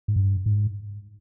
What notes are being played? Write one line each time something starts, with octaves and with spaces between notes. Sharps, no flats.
G#2
G2
G#2